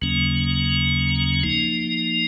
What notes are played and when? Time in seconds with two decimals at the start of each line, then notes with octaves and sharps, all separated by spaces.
0.02 D#2 C#3 F#3 A#3 C#4
1.43 F3 A#3 D#4